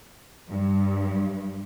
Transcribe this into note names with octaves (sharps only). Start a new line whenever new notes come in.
G2